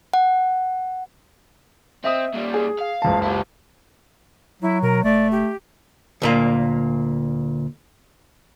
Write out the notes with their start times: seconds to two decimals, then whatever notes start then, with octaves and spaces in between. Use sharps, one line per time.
0.14 F#5
2.04 C4 D#5 E5 D#6
2.34 A#2 G3
2.54 G#4
2.79 F5
3.02 F#1 C#2 A5
3.23 E4 G4
4.62 F#3 E4
4.83 B2 A#4
5.04 E1 A3 D5
5.31 G4
6.22 D2 A#2 A#3